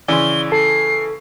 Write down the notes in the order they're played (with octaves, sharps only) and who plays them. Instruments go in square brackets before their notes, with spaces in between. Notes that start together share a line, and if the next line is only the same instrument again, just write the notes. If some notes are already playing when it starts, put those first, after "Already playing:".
[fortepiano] C#3 E3 [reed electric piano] D5 C6 [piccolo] G7
[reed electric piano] A4 [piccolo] C7